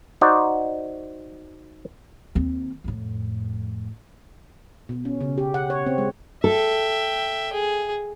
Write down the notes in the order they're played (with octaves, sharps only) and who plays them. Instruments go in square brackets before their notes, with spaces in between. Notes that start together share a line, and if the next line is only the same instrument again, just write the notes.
[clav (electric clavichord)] D#4 F#4 C5 D5
[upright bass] D#2 C4
F2 A2
[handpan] B2
C#4
C#3
G4
F#5
C#5
C4
G#3
[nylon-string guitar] A4 [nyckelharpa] E5 G5
[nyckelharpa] G#4